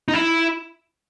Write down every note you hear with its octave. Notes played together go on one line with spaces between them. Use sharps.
D#4
E4